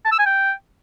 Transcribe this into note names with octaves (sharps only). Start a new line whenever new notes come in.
A5
E6
G#5
G5